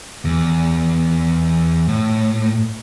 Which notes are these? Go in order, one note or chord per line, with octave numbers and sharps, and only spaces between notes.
E2
A2